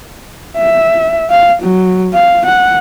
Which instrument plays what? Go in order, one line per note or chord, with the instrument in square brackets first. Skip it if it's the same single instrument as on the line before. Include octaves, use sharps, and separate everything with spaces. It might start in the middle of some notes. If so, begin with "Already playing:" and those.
[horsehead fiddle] E5
F5
F#3
F5
F#5